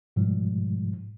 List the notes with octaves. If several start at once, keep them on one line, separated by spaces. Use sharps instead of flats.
G#2 B2 F3 G3 G#3